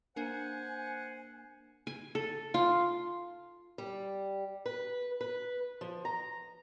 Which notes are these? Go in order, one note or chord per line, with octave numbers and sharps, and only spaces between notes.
A#3 D4 C5 F#5 G#5
G#5
A4
F4
G3
B4
B4
F3
A#5